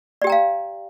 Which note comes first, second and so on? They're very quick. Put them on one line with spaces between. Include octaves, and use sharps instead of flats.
D5 G4 G5 A#5 F5